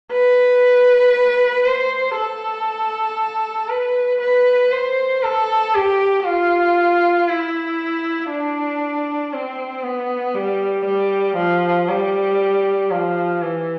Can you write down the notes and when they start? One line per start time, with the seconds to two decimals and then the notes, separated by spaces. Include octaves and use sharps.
0.12 B4
1.65 C5
2.16 A4
3.69 B4
4.21 B4
4.72 C5
5.23 A4
5.75 G4
6.25 F4
7.28 E4
8.30 D4
9.33 C4
9.84 B3
10.35 G3
10.85 G3
11.37 F3
11.89 G3
12.91 F3
13.42 E3